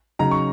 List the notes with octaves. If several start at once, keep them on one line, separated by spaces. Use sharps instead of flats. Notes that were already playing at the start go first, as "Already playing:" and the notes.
C#3 F#3 D#4 A#5
C#6